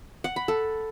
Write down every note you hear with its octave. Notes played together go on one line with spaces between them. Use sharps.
F#5
B5
A4